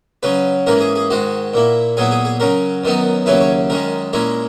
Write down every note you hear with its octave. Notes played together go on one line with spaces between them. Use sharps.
C#3 F#3 C#4 B4
G#2 E3 A#3 C#4 A#4
G#4
G#4
G#2 D#3 G#3 F#4
A#2 A#3 E4
A#2 F#3 B3 E4 G#4
G#4
G#4
C#3 F#3 C#4 A#4
F#2 D#3 F#3 B3 D#4
D#2 C#3 F#3 C#4 E4 B4
C#5
F#2 D#3 G#3 C#4 A#4
A#2 G#3 C#4 E4 A#4